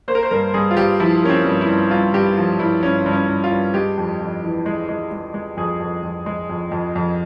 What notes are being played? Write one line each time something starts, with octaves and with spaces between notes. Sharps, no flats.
A#3 C5
A#4
C5
G2 A#4
G2 G#4
F4
G2 G4
F3 E4
A#3 C#4
C4
G2
E4
G2
G2 F4
G2 G4
F3 F4
G2 E4
G2 C#4
G2
C#4
G2
F4
G2
G#3 G4
F2
F2
E3
G#3
G#3
G#3
G#3
F2 G#4
F2
F2
G#3
F2
F2
F2